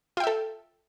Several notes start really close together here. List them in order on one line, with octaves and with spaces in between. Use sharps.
F4 G5 E5 A4